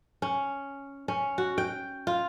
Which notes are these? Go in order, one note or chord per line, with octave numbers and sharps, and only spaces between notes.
C#4
C#4
F#4
G5
F4